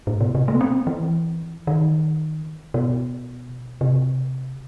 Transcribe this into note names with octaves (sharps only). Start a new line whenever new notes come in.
A2
B2
C3
A3
B3
C4
E3
D#3
B2
C3